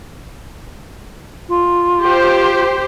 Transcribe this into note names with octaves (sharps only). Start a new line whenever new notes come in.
F4
G4 C5